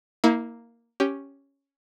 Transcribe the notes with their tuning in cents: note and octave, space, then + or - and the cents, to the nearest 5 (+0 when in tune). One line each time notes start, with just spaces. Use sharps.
A#3 +0 E4 -35
C#4 +0 G4 +0